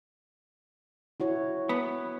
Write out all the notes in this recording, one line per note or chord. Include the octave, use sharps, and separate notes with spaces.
E4 F#4 C#5
B3